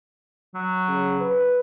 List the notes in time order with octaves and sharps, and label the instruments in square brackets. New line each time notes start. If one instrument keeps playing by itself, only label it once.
[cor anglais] F#3
[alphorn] C#3
B4